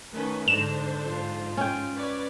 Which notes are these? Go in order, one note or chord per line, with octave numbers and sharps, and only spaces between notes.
D#3 A3 C#4 B4
G#2 D3 D4 A4 C5 E7
G#2 F4
C#4 G5
B4 C#5 D5